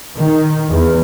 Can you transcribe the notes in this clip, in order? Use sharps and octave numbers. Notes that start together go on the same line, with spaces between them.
D#3
E2